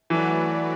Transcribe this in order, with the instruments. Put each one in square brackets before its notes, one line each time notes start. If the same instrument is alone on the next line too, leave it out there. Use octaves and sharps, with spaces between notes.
[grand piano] E3 [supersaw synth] F#3 A3 F#4 B4 D5